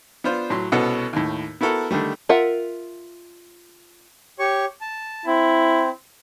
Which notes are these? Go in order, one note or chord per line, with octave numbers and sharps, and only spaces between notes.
B3 D4 F4 C5
A2 F#3 C6
C2 B2 B3 C#4 A4 F#5
D#2 A2
B3 E4 F#4 A4 A#4
D3 D#3 G3 A3
F4 A#4 E5 F#5
G4 C#5 C#6
A5
C4 E4